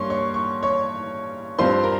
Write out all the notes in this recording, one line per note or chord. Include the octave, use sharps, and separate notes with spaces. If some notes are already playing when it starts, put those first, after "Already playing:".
Already playing: G2 G3 A#3 C#5 C6 C#6
C#5 C#6
C#6
C#5 C#6
G2 G3 C4 F4 C5 C6
A#4 A#5